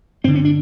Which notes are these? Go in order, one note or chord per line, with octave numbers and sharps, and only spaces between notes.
G2 D3 C4
C#4
D4